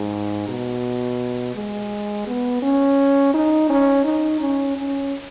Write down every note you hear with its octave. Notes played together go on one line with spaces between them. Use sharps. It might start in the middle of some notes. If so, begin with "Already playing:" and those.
Already playing: G#2
B2
G#3
B3
C#4
D#4
C#4
D#4
C#4
C#4